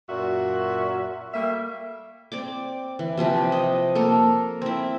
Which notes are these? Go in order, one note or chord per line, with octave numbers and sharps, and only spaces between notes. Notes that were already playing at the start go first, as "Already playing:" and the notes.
F#2 A#2 F#4 E5
G3 A3 A#3 E5
C4 D5 D6
E3
C3 F3 C4 B4
D#5 G5
A#3 A4 A#4
C4 E4